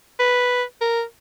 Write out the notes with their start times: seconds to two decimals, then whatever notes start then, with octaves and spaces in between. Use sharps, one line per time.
0.19 B4
0.81 A#4